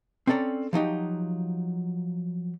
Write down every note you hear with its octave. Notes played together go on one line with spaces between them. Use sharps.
C4 C#4 A4 D5 A#5
F3 F#3 D#4 G4